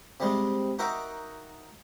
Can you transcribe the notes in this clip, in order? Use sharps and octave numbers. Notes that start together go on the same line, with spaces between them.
C3 G3 G#3
D#4 F#4 A#4 E5 G5 D6